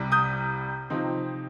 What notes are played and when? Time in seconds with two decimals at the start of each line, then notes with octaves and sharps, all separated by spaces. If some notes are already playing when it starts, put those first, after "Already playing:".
Already playing: C2 C3 G3
0.12 D#6 G6
0.90 C3 F3 C4 D#4